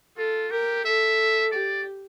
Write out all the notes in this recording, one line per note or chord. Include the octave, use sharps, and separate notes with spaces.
F4 A4
G4 A#4
A4 E5
G4 D5